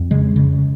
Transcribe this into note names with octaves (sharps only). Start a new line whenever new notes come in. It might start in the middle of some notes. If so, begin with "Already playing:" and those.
Already playing: F2
C#3 G#3
C#3